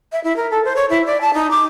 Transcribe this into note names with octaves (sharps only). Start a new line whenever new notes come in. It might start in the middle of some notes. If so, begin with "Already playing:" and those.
E5
E4
A#4
A4
C5
C#5
E4
D5
A5
D#4
D6